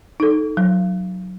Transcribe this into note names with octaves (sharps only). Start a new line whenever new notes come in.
D#4 A4
F#3